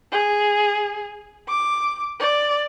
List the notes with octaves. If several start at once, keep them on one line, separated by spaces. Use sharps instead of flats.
G#4
D6
D5